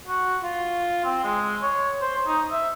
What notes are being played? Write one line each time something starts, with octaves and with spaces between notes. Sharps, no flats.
F#4
F4
C4
G#3
C#5
C5
D#4
E5